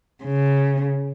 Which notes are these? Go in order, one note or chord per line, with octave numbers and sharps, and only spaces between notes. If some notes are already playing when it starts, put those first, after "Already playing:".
C#3